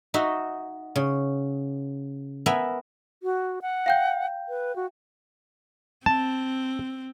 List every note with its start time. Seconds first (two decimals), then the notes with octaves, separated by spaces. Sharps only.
0.14 D#4 F#4 D#5 E5
0.96 C#3
2.46 B3 A#4 E5 G#5
3.23 F#4
3.62 F#5
3.86 F5 G5 G6
4.49 B4
4.76 F#4
6.06 C4 A5